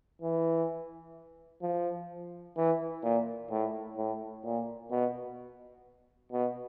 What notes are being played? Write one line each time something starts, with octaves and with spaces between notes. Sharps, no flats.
E3
F3
E3
A#2
A2
A2
A#2
B2
B2